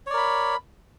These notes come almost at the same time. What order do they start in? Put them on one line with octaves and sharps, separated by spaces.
C#5 D5 A#4 B5